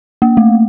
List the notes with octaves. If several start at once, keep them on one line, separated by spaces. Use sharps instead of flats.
A#3
A3